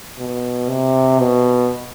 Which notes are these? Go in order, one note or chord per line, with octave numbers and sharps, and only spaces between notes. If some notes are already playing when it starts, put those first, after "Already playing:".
B2
C3
B2